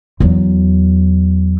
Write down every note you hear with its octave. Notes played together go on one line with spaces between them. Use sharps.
E2 F#3